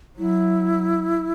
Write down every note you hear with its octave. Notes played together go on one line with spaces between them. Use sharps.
F#3 E4